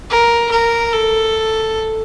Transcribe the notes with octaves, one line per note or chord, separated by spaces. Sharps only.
A#4
A#4
A4